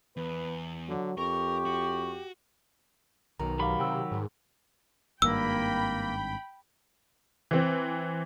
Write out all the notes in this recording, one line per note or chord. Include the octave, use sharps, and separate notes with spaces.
E2 B4
D3 F#3
F2 G4 A#4 C#6
F#4
B1 D#3 A#5
F#3 G4 F5 B5
C3 G5 E6
G#2
G#1 G2 A#3 G5 B5 E6
E3 C4